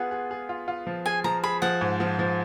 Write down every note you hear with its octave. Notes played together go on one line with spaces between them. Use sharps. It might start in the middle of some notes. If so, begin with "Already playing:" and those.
Already playing: B3 F4 G#4 F#5
G#4
G#4
F4
F4
F3
G#4 G#5
F3 A#5
G#4 B5
F3 F#5
G#2
F3
F3